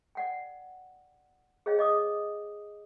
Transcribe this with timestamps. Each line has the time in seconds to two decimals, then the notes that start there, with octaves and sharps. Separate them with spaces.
0.15 D5 F#5 G5
1.66 G#4 C5 C#5 D#5 F5 G5
1.79 D#5 D6 D#6